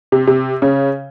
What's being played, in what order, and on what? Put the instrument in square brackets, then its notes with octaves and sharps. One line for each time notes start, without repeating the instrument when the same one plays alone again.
[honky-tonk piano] C3
C3
C#3